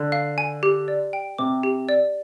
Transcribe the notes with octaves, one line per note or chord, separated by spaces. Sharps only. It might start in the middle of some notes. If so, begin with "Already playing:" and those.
Already playing: D3
F5
G#5
G4
D5
G5
C3 D6
G4
D5